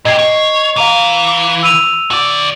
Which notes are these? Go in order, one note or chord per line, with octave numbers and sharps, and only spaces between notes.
A#2 G4 D#5 G#6 C7
C#5
E3 F5 A#5 F7
E6 D#7 F7
F#4 D5